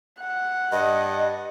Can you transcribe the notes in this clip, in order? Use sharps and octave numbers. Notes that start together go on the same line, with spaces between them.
F#5
G2 D#5